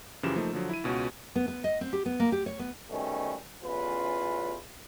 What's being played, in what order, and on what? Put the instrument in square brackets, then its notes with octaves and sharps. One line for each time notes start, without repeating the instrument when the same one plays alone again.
[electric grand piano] F#2 C#3 E3 F3 G4 E7
F3 A3 A#3 D#4
D3 F3 F#3
E4 D#7
C#2 B2 C#4 F4 F#4
[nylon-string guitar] B3
B3
D#5
C4
G4
B3
A#3
G4
C#5
B3
[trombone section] B2 D#3 G3 A3 C#4
A1 E2 C#4 F4 B4